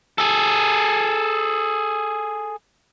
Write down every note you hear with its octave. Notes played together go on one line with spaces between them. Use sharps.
G#4 A4